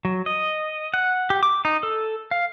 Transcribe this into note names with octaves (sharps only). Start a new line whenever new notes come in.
F#3
D#5
F#5
G4
D6
D#4
A4
F5